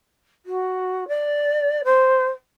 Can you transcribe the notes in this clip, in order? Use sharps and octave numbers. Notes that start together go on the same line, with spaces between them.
F#4
D5
C5